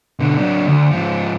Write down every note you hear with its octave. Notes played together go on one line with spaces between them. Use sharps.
B2 D3
F#3 D4
D2
G#2 F3